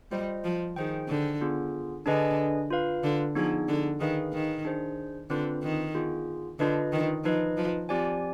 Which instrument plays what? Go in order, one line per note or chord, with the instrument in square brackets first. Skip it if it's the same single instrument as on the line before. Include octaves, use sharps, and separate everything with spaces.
[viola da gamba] G3 [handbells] F4 C5 D#5
[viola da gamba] F3
[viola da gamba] D#3 [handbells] G#4 C5 G5
[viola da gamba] D3
[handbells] B3 F4 G#4
[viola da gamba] D3 [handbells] D4 G#4 B4 D#5 G#5
[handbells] F4 B4 F5
[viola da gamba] D3
[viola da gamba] F3 [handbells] B3 D#4 G#4
[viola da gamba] D3
[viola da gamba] D#3 [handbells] G#4 B4 F5
[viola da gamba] D#3
[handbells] D4 G#4 C5
[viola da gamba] D3 [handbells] C4 F4 B4
[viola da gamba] D#3
[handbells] B3 F4 G#4
[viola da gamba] D3 [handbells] D4 F4 B4 D#5
[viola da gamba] D#3
[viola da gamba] F3 [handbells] D#4 B4 D#5
[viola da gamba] F3
[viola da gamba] F3 [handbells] C4 G4 D5 G#5